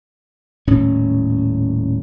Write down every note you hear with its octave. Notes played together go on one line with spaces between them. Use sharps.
D#1 A2 C#4